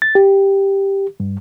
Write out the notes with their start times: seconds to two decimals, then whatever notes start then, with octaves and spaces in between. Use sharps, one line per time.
0.02 A6
0.15 G4
1.20 G2